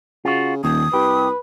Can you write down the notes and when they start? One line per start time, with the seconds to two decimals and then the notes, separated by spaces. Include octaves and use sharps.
0.25 C#3 F4 F#4
0.64 D#1 D#2 D#6
0.94 C2 G4 B4